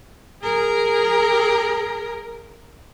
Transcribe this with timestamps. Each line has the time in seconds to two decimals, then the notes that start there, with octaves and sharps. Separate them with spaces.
0.43 G#4 A#4